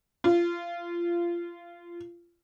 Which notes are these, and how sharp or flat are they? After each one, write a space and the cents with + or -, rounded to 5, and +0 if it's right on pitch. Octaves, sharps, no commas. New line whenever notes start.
F4 -25